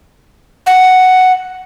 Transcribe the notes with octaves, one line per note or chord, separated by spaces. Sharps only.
F#5